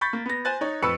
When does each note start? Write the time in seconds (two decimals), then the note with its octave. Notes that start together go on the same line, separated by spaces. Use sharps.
0.01 B5 C#6 G6 A6 B6
0.13 A#3
0.26 B3 A#6
0.45 C5 G#5 F#6 A6
0.61 D#4 C#5
0.82 F2 B4 B5 C#6 E6 C#7